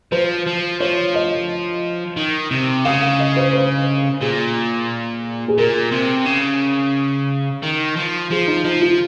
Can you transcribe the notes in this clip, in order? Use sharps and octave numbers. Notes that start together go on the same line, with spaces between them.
F3 C5
F3
F3 C#5
D#5
D#3
C3
C#3 F5
F5
D#5
C5
C5
A#2 G#4
G#4
A#2 A#4
C3
C#3
D#3
F3
F3 G#4
D#4
F3 D#4
F4